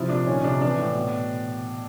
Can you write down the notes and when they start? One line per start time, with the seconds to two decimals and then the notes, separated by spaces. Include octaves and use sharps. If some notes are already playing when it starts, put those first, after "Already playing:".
Already playing: C3 F3 E4
0.09 A#2 D4
0.27 D#3 C#4
0.44 C3 D4
0.61 E3 D4
0.78 A2
0.95 B2